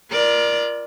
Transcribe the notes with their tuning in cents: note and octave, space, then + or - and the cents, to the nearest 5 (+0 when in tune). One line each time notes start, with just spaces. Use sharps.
F4 -30 A#4 +25 D5 +10